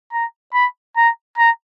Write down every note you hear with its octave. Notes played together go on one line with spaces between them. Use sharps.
A#5
B5
A#5
A#5